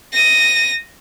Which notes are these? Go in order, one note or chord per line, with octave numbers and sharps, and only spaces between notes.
A#6 D#7